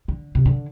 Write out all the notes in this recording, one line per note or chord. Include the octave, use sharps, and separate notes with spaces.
D3
C3
D3